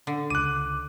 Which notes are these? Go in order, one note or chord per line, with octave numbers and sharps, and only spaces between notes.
D3
C#2 D6 F#6 D#7